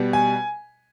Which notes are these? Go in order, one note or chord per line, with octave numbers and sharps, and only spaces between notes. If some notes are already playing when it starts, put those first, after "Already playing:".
Already playing: B2 G3
G#5